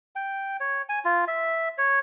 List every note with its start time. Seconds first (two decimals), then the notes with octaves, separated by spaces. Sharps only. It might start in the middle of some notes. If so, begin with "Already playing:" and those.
0.16 G5
0.60 C#5
0.89 G#5
1.05 F4
1.28 E5
1.78 C#5